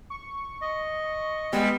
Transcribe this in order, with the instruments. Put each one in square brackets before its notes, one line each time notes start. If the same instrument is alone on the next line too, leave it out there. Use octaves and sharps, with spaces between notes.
[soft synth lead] C#6
[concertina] D#5
[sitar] G3 [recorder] G#3 [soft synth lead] B3